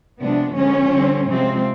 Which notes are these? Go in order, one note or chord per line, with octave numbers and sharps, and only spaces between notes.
C3 F3 G#3 B3 D4
D3 F3 G#3 B3 C#4
D3 G3 C4
C3 F3 G#3 C4